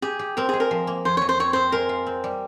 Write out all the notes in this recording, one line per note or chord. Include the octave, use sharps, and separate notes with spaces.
G4 G#4
G4
C4 A#4
G#3 G#4
A#4
F3
A#3
F2 C5
F2 C#5
C5
C4 C#5
C4 C5
G#3 A#4
F4
C4
G3